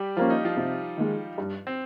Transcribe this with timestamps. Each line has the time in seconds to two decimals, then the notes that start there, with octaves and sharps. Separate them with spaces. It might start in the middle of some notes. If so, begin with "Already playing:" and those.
Already playing: G3 G4
0.17 F3 A#3 C#4 F4
0.30 D#4
0.44 F3 F4
0.57 C3
0.97 D#3 G#3
1.38 G2
1.67 C4